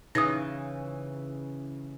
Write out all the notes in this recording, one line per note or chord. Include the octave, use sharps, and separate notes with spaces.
C#3 E3 D#4 D#6 A#6